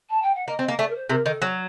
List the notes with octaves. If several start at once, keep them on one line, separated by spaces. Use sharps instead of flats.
A5
G5
F#5
A#3 D#5
C4
D#5
A#3
A3 D5
A#4
C5
C3 A#4
D#3 A4
F#3